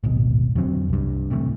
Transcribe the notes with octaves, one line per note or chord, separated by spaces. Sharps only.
D1 G#1 B2
F2 D3 F#3 C4
C2 G2
D1 C3 E3 A3